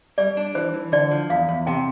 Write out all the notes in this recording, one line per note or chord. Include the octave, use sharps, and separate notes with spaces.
G3 D5
D4
E3 C5
E3
D3 D5
F3
E2 F5
E2
C3 G5